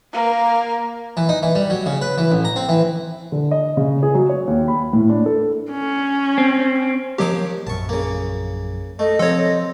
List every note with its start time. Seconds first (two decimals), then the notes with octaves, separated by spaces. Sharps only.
0.13 A#3 A#4
1.17 E3
1.29 D#4
1.43 E3
1.55 G3
1.70 F#3
1.86 C#3
2.01 B4
2.18 E3
2.32 A1
2.45 A#5
2.56 C4
2.69 E3
3.32 D3
3.51 D#5
3.77 C#3
4.03 G#4
4.15 F#3
4.29 C#5
4.47 D#2
4.68 B5
4.93 A2
5.10 D4
5.26 A4
5.71 C#4
6.38 C4
7.18 D#2 F3 F#3 G4 D6
7.67 A#1 F#2 A5 C#6
7.89 C#3 A#3
8.99 A3 D#5
9.19 C3 F3 C4 A4 C#5